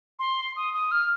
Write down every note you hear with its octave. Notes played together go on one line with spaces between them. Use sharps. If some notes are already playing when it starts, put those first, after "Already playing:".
C6
D#6
D#6
F6